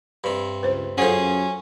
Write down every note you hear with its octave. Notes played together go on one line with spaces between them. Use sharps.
G2 C3
C#2 B4 C5
F#2 C#4 F4 G#4 A4 C5 F#5